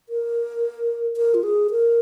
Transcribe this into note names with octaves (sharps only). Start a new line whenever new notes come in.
A#4
A#4
F4
G#4
A#4